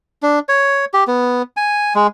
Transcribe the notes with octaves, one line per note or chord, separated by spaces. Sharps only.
D4
C#5
G4
B3
G#5
G#3